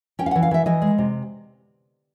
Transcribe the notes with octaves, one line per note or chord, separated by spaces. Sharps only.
C#4 G5
F5
E3 F#5
F5
E3 E5
E3 D#5
G#3
C3